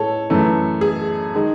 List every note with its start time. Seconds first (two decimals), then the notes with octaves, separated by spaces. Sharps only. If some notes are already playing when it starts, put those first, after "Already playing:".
Already playing: A2 G#3 A4 C#5
0.30 F#2 E3 A3
0.81 G#4
1.35 D#3 G#3